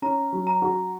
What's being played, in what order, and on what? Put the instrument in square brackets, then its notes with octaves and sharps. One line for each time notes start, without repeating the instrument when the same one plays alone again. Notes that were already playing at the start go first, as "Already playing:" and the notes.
[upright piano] C#4 [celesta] A#5
[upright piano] F#3
[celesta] A#5
[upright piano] F#4